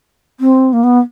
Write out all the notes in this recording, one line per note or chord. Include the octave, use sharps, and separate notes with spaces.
C4
A#3
B3